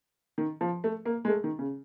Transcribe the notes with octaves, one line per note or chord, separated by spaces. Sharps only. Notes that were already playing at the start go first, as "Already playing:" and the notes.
D#3
F3
A3
A#3
G#3
A3
D#3
C#3